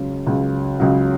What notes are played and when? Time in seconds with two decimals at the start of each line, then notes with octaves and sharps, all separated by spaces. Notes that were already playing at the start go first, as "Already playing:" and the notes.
Already playing: C#2 C#3 F#3
0.26 C#2 C#3 F#3
0.80 C#2 C#3 F#3